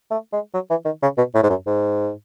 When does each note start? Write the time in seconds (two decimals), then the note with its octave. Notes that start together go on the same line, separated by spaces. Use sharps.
0.11 A3
0.33 G#3
0.54 F#3
0.70 E3
0.85 D#3
1.03 C#3
1.18 B2
1.35 A2
1.43 G#2
1.50 F#2
1.67 G#2